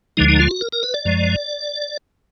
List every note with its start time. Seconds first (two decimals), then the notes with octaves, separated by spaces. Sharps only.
0.17 D2 D3 F3 G#3 D#4
0.29 D#4
0.40 F4
0.51 F#4
0.61 A#4
0.72 A#4
0.83 B4
0.94 D5
1.05 F#2 F3 G#3